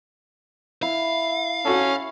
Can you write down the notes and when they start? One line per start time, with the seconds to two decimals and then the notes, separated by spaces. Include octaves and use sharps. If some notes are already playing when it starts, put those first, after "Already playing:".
0.82 E4 F5
1.65 C#4 F#4 A4